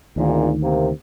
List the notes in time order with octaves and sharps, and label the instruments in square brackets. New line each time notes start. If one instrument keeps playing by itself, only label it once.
[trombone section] G#1 A#2 [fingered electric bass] D2 D#3
[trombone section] C3 A#3